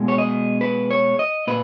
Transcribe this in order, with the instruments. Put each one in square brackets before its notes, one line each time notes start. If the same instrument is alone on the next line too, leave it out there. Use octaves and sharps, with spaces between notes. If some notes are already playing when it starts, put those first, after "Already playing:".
Already playing: [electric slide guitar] B2 G#3
C#5
D#5
B4
C#5
D#5
A#2 B4